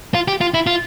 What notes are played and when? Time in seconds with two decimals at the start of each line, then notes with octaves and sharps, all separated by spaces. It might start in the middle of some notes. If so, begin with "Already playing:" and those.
0.15 F4
0.28 G4
0.41 F4
0.54 E4
0.67 F4